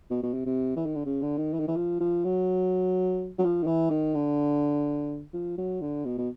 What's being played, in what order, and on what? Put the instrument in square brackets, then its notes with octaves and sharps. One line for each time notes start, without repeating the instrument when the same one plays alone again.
[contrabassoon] B2
B2
C3
C3
E3
D#3
D3
C#3
D3
D#3
E3
D#3
E3
F3
F3
F#3
F#3
F3
D#3
E3
D#3
D3
F3
F#3
D3
B2
B2